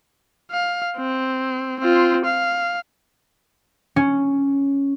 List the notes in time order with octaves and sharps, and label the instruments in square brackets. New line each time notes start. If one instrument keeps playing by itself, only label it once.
[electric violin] F5
C4
C4 F4
F5
[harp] C#4